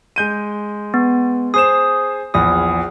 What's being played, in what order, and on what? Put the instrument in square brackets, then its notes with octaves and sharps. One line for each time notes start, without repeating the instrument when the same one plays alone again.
[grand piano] G#3 G6 D#7
[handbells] B3
[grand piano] G#4 C5 E7 [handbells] D#6
[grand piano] A#1 E2 [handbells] D#6